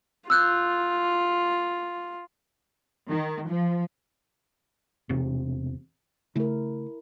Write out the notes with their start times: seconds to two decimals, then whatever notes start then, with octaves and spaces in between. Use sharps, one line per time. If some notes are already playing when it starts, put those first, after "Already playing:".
0.30 F4 E6 F#6 G6
3.08 D#3
3.50 F3
5.09 E1 C3
6.36 C#3 A3 E4 A#4